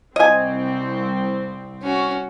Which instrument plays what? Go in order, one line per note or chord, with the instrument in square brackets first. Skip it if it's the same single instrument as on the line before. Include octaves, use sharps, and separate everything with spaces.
[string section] C2 C4 [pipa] D#5 G#5
[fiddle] C#4 F#4